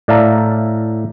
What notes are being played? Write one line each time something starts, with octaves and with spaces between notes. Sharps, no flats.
A2 D5 E5 F5 A5 A#5